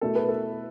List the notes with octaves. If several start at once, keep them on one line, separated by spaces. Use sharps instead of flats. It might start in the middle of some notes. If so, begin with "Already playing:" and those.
B2 A3 E4 A4
B4
A4